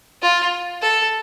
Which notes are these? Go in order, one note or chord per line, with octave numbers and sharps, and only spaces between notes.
F4
A4